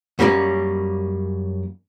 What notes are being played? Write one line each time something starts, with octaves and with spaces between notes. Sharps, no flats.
F#2 G3 A#3 B3 C#4